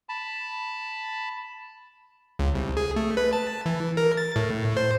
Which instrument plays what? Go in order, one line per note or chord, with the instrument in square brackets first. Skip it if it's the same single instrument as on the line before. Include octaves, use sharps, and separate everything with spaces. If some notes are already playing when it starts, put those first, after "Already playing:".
[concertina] A5 B5
[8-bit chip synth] C#2
C2
G#4
A3
B4
A5
E3
A#4
A6
A2
C5